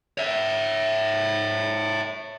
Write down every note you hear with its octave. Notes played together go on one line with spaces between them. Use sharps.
C#5 E5